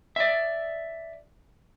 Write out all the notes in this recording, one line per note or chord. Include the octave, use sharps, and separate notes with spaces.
D5 E5